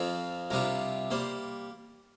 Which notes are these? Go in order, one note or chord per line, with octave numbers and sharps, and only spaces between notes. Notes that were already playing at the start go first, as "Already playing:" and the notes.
Already playing: F2 F3 C4 F4
C2 C3 G3 D4 F4 A#4
G3 A#3 C5